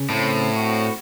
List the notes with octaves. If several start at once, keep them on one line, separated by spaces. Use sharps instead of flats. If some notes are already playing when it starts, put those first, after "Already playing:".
Already playing: C#3
A2 C4
F#4